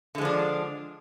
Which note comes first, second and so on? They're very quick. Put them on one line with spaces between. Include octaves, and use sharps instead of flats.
D3 G#3 F3 D4